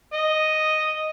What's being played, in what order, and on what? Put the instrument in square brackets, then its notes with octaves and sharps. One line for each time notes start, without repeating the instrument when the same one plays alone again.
[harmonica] D#5